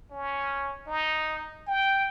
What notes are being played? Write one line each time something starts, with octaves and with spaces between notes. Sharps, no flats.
C#4
D#4
G5